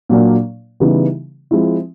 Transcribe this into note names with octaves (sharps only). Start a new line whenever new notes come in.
A#2 F#3 A#3 D4
C#3 E3 G3 B3 D#4
F3 G#3 C4 E4